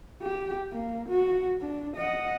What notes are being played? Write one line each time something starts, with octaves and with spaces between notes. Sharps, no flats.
G4
A#3
F#4
D4
D#5 F#5